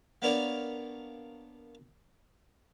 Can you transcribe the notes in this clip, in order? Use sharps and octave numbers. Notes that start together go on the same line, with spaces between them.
A#3 B3 D4 A#4 C#5 D5